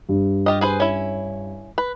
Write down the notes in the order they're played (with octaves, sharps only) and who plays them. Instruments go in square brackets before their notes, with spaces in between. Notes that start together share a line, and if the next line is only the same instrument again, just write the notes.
[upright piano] G2
[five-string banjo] F4 G4 D#5
G#4 B4 C5
C#4 E4
B4